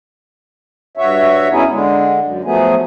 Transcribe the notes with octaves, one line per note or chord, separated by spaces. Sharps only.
G2 F#4 C#5 E5
B3 C#4 D#4 E4 G#4
D3 G#3
F#2
F3 F#3 A3 B3 G#4